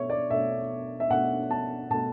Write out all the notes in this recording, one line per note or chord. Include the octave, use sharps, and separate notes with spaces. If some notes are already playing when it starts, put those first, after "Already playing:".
Already playing: B2 A3 C#5 E5
D5
B2 A3 E5
E5
B2 A3 F#5
A5
B2 A3 A5